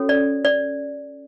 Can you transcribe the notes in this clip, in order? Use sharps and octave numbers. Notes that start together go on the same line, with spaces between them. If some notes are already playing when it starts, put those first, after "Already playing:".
Already playing: C#4 F#4 A4 C#5
D5
D5